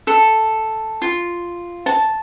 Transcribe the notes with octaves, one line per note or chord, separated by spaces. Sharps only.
A4
F4
A5